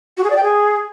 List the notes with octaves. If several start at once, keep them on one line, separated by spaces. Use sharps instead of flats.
F#4
G#4
D5
G5
G#4